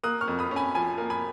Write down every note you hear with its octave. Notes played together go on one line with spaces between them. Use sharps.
A#3 D#6 F#6
C#6 F6
F2
B5 D#6
C#4
G#5 B5
F3 G#5 B5
A#3
G#5 B5